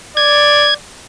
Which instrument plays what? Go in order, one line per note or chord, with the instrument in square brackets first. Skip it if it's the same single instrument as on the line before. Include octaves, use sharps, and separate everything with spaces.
[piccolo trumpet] D5 [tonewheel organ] G#6